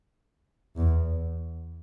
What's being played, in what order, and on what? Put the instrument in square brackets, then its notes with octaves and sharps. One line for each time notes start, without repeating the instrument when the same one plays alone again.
[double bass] E2